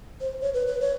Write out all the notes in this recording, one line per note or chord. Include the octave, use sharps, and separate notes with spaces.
C5
C#5
B4
B4
C#5